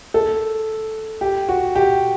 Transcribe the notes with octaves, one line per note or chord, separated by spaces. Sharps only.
A4
G4
F#4
G4